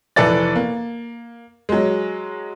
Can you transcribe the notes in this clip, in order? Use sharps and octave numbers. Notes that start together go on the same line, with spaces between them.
F1 E3 A4 B4 D5 A6
A#3
F#3 G#3